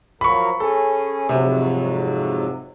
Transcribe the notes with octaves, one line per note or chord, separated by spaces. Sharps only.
F3 F#3 A#4 B5 C#6
C#4 G#4 A4
F2 G#2 C3 F#3